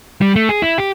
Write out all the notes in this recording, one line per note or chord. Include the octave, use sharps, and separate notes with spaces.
G3
A3
G#4
E4
G4